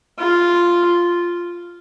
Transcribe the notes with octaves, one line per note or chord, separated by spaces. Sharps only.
F4